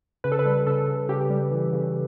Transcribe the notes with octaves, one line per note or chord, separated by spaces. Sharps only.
C#3 B4
A4
B4
G3
C#3 A4
C#3
C#3 G4
G3
E3
C#3